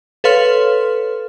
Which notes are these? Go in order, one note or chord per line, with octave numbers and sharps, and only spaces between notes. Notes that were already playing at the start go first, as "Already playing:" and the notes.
A4 B4 C#5 F5 C6 F6